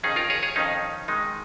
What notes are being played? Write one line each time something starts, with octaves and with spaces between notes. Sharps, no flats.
F2 D#3 C#4 D#4 G#4
F4 A#4
G#4 C#5
G#4 C#5
F2 D#3 C#4 D#4
D#3 G#3 D#4